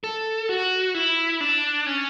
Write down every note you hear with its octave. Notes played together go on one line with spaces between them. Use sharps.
A4
F#4
E4
D4
C#4